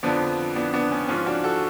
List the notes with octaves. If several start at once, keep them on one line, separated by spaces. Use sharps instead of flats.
F2 D3 F3 B3 D4
B3 D4
B3 D4
C#4
G#2 F3 C#4 F4
D4 F#4
F#4 A4